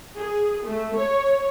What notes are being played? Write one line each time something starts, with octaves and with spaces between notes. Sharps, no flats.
G#4
A3
C#5